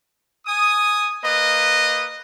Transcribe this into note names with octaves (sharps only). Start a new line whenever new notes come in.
G#5 D#6
A#3 B4 D#5